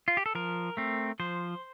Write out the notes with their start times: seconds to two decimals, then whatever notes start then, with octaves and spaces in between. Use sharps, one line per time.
0.08 F4
0.17 G4
0.26 A4
0.35 F3 A#4
0.77 A3 C4
1.20 F3 C5